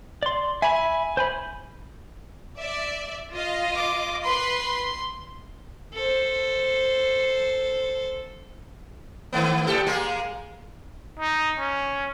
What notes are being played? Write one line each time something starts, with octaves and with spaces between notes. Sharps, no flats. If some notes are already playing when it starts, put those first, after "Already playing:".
D5 C6
E5 G#5 B5
C5 G#5 B5
D5 E5
F4 D#5 F5
D6
B4 B5 C6 C7
A4 C5
D#3 A3 B3
A2 G4 A4
G#3 A#3 G#4
D#4
C#4